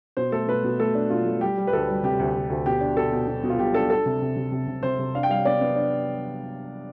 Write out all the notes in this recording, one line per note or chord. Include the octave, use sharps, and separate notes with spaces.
B2 C5
A3 A4
B2 B4
B2
A3 A4
D4
B2 F4
A3
G3 G4
G3
B4
D2 A4
G3
C3 G4
D2
D2
D2
B2 G4
D4
B2 A4
B2
B2
B2
F4
B2 G4
D4 A4
D4 A4
C3
C3
C3
C3
C3
C3 C5
C3
D4 F5
G5
G3 F5
B3 D5
B3
D4